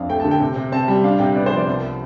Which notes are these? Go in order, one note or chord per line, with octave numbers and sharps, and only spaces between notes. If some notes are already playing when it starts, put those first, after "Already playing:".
Already playing: F2 D4 F5
A3 G5
D3 A5
G5
C3
C3
C4 A5
G3
D4 F5
C3 G5
B3 D5
C5
F3
D5
C2